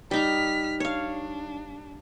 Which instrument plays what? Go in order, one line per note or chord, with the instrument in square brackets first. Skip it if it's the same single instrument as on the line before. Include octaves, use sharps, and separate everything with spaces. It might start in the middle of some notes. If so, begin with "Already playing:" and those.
[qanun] G3 D#4 A#5 [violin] F6 B6
[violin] D4 [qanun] C#5 F5